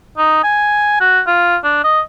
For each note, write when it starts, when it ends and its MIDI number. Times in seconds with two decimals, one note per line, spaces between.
0.18 0.42 63
0.44 0.96 80
1.00 1.21 66
1.27 1.57 65
1.64 1.81 62
1.84 2.01 75